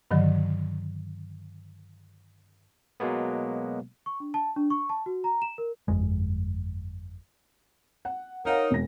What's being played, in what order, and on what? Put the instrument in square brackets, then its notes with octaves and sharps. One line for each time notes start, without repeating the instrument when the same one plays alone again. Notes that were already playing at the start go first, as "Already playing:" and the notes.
[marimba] G2 D3 D#3 F#3
[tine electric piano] B2 F#3 G#3 A#3 B3
[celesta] C#6
D4
A5
D4
C#6
A5
F#4
A#5
E7
A#4
[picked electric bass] G1 F2 G#3
[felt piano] F#5
[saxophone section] D#4 A#4 [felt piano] C#5 F5 F#5
[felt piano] E1 A#6